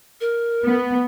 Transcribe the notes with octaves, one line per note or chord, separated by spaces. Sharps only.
A#4
B3